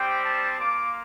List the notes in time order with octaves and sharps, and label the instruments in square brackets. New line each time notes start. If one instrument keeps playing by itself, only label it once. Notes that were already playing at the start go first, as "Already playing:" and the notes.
Already playing: [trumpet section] G3 C4 G4 G5
A5
A#3 F4 D6